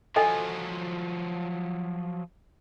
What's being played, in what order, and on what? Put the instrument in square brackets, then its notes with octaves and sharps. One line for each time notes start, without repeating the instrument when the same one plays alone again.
[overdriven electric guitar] F3 F#3 [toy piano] A4 D#5 G#5